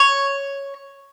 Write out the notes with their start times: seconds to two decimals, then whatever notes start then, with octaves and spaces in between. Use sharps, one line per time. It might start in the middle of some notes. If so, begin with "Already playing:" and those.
Already playing: C#5